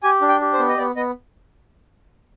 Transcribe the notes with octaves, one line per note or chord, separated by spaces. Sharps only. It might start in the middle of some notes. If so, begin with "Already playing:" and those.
G4 G#5
D4
G5
G4
C5
B3
D#5
B3 D5
B3 D#5